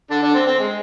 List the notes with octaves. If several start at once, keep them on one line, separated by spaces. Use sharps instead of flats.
D3 D4
D3 D4
C4
C4
G#3